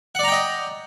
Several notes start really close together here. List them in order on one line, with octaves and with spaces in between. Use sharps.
F#5 D5 A#5 G5 D#5